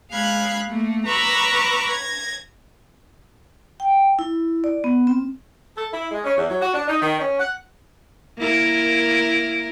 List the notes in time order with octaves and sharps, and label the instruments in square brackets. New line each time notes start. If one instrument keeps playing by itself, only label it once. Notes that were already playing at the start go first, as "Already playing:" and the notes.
[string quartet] G#3 F5 B5 F#6 G#6
A3 A#3
B4 A#5 B5 C#6 D6 E6
G#6 A#6
[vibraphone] G5
E4
D5
B3
C4
[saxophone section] A4
E4
G#3
C#4
E2
F#3
F#4
D4
D#4
D#3
C#4
F#5
[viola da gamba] A#3 E4 A#4